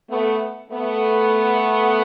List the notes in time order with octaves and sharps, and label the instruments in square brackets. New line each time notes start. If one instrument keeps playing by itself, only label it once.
[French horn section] A3 B3
A3 B3